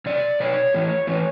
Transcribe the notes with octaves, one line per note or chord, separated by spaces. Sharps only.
B2 D5
B2 C#5
A2 E3
A2 E3